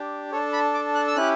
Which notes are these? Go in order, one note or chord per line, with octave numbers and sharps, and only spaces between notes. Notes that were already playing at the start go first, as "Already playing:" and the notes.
Already playing: D4 G4
D4 A4 C#5
B5
D6
F#6
E6
C#4 E4 G4 F#6